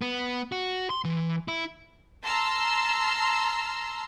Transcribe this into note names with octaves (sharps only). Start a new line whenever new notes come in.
B3
F#4
C6
E3
E4
A5 A#5 C6 E6 F6